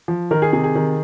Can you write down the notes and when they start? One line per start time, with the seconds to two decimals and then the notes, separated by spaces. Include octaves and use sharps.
0.08 F3
0.31 D#3 A#4
0.42 G#4
0.53 C3 G#4
0.64 G#4
0.75 D#3